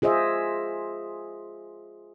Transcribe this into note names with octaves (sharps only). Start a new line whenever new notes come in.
F4 G#4 C5 D#5 E5